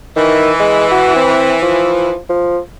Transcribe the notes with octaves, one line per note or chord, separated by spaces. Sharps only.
D#3 E3
G#3
F#4
C4
F3
F3